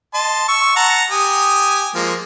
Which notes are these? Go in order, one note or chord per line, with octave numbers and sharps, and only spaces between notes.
D#5 A5 C6
C#6 E6
F#5 A5 A#5
G4 G#5 D#6
F3 G#3 A#3